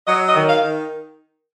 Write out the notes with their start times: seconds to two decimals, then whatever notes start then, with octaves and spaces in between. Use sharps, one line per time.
0.07 F#3 D#5
0.28 D#5
0.35 D#3
0.49 F5
0.63 D#3